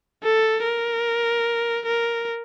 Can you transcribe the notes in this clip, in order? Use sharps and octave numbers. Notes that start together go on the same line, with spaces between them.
A4
A#4
A#4